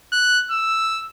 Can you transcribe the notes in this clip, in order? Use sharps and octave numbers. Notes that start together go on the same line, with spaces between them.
F#6
E6